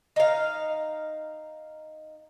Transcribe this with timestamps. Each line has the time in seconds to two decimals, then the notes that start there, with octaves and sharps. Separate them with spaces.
0.16 D#4 F5